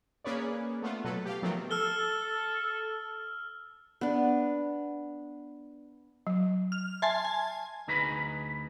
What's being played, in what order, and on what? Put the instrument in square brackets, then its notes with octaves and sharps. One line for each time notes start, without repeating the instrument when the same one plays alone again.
[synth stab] A#3 C#4 G#4 B4 C#5 D5
A3 B3 F4
B2 F#3 A4 B4
G4 F5
D#3 F3 F#3 A3 B3 C4
[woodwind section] A4 [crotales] E6 F6 G7
[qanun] B3 D4
[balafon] F#3
[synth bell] F6
[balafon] E5 [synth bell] G#5 A5 C6
[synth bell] G#5
[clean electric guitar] D2 D#4 G#4 B4 A#5 B5